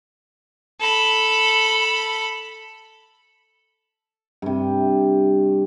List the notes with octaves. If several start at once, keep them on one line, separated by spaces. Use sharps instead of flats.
A4 B5
G2 C3